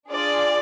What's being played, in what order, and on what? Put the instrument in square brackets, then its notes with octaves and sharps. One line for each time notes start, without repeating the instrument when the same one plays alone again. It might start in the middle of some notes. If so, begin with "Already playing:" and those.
[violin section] D4 F4 G#4 D5